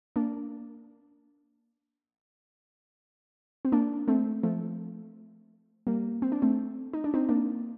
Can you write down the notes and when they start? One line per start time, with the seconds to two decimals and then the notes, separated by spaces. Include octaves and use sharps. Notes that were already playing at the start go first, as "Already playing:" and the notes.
0.16 A#3 D4
3.65 C4
3.72 A#3 D4
4.08 A3 C4
4.43 F3 A3
5.87 G3 A#3
6.22 C4
6.32 D4
6.42 A3 C4
6.93 D#4
7.04 D4
7.14 C4 D#4
7.29 A#3 D4